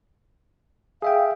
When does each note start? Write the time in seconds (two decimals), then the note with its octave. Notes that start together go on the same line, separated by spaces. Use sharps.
1.02 G#4 E5 F5 G5